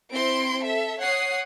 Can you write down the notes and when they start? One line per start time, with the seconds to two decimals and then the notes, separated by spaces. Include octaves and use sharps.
0.12 C4 E4 C6 D7
0.62 A4 E5
1.01 C#5 F#5 D#6 C7